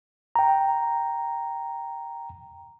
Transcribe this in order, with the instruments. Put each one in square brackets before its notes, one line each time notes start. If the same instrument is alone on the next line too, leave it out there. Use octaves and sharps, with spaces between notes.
[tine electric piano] G5 A#5